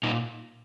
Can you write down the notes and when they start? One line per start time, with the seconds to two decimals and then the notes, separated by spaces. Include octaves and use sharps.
0.03 A#2 D#4